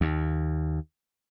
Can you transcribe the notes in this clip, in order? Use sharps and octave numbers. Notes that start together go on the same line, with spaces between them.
D#2